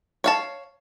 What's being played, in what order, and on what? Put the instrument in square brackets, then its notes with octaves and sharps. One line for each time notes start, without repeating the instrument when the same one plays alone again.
[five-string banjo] C#5 F5 A5